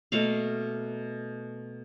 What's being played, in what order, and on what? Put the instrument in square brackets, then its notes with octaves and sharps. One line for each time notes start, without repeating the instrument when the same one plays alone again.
[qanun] B2 A3 A#3 F5